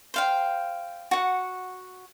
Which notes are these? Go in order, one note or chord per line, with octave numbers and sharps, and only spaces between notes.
C5 F5 G5
F#4 F#5